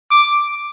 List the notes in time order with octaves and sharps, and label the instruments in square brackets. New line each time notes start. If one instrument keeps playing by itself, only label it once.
[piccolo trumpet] D6